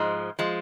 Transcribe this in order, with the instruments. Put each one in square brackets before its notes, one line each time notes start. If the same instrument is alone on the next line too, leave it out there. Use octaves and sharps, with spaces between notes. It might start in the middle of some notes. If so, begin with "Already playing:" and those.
Already playing: [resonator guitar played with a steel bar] G#2 F3 G#3
F3 G#3